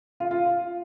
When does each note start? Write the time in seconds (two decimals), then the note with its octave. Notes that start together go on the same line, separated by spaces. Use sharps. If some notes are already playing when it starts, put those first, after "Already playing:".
0.20 F4
0.31 F4